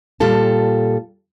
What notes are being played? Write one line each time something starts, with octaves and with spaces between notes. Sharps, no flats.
A#2 G3 F4 A4 A5